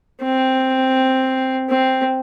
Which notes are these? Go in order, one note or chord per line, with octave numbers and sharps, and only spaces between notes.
C4
C4